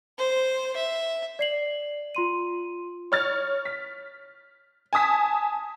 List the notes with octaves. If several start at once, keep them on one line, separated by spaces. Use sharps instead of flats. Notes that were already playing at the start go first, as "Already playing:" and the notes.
C5
E5
D5 C7 F#7
F4 C6 D#7
C#5 F6 A6
B6
G#5 A5 D#6 B6